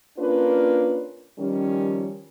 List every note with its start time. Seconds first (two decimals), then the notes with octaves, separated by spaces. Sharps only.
0.19 A#3 C#4 D4 F4 B4
1.39 D#3 F3 G3 C#4